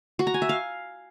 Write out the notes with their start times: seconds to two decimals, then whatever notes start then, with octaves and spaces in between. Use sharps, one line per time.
0.19 F#4
0.27 A#5
0.34 G#5
0.42 E5
0.49 F5